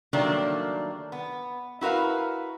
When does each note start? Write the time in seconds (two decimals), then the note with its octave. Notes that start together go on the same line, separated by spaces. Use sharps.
0.13 D#3 F#3 G3 A3 A#3 D4
1.12 B3
1.81 E4 F#4 A#4 B4 F5